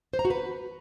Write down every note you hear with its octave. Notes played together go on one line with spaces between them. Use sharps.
C5
A#5
F#4
B4